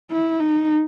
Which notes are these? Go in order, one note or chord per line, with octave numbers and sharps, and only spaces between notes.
E4
D#4